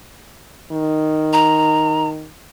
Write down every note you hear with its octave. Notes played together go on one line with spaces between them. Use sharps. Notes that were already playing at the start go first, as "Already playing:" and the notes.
D#3
A#5